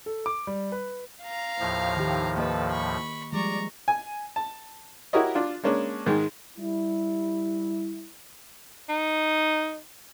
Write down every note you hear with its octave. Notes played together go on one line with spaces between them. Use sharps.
A4
D6
G3
B4
F5 A#5
D#2 A2 F3
D#3 G4
A#3 A4 B4 D#5
B5 C#6
F3 G3 G#3 D5 A#5 C#6
G#5
A5
E4 F#4 G4 A#4 C#5 D#5
D4 F4
G#3 A#3 C#4 D4
G#2 D#3 G#3
G3 E4
D#4